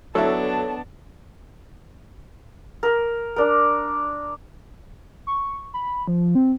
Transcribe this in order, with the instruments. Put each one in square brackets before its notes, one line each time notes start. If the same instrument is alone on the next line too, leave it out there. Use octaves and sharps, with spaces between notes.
[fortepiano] F#3 E4 E5 [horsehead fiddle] B3 A5 [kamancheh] D4 [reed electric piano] A4 C#5
[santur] A#4
D4 A#4
[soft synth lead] C#6
B5
F3
C4